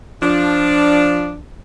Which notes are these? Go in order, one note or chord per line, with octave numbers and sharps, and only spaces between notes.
F3 D4